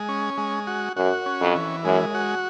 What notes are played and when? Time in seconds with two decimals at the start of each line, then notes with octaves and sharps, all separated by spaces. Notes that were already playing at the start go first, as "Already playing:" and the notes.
Already playing: G#3
0.09 C#4
0.38 G#3
0.67 F#4
0.97 F#2 F#4
1.26 C#4
1.40 F2
1.55 E3
1.85 F#2 G#3
2.14 F#4